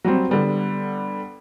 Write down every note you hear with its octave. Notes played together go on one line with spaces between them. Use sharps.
F#3 G3 C4
D3 G3 B3